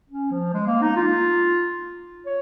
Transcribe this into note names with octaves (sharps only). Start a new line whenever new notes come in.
C#4
F3
G#3
A#3
D#4
F4
C#5